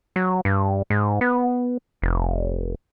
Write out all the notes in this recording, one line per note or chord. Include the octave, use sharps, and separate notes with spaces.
F#3
G2
G#2
B3
F1